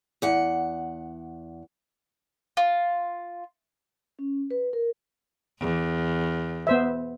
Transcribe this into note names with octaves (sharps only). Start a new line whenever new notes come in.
E2 F#5
F4
C#4
B4
A#4
E2
B3 C5 E5